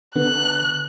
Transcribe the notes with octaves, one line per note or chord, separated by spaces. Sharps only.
D3 B3 F#6